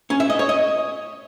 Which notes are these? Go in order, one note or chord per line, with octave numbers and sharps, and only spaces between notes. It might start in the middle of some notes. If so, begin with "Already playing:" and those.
C#4
E5
D#5
C#5
D#5